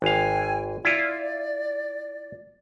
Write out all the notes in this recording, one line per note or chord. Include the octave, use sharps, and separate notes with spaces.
G#1 F5 G5 G#5
E4 F4 D5